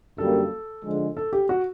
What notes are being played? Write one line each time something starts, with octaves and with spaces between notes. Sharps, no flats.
F#2 D3 G3 A#3 A4
D3 F3 G#3
A4
G4
F#4